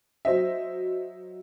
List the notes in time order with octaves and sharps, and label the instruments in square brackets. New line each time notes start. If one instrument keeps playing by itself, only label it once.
[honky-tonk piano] F#3 C5 D#5 E5